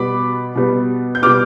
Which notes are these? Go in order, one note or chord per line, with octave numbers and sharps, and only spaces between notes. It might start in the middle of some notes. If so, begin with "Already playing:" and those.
Already playing: B2 G3 B3 B5 D6
B2 G3 B3
G6
B2 G3 B3 D6 F6